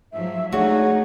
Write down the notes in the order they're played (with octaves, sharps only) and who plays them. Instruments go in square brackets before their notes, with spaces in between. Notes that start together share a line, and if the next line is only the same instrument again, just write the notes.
[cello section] G#2 F3 F#3 [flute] E5
[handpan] A3 G#4 [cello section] D4 D#4 [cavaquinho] F#4 [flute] C#5